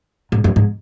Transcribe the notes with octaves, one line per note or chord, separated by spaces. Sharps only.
G#2
F#2
G#2